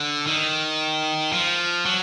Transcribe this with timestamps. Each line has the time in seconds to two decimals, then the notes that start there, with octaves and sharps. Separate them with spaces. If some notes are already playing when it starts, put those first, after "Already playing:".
Already playing: D3
0.27 D#3
1.32 F3
1.86 F#3